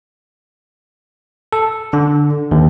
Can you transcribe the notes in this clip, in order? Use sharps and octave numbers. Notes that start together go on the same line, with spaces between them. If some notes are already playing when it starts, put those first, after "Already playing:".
A4
D3
D#2